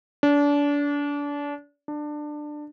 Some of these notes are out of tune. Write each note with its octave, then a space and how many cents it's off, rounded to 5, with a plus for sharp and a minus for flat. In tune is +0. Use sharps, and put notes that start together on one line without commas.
D4 -30
D4 +20